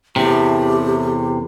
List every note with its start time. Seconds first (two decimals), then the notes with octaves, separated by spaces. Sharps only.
0.16 E2 A2 C3 G4